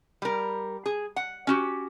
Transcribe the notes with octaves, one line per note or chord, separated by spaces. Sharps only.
G3 A#4
G#4
F#5
C#4 F#4 G4